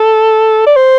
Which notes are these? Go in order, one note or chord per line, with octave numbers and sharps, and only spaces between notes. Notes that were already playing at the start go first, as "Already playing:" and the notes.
Already playing: A4
D5
C5